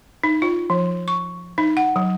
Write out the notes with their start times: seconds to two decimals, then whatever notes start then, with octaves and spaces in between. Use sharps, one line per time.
0.24 D#4
0.42 F4
0.70 F3
1.08 C#6
1.58 D#4
1.77 F#5
1.96 F#3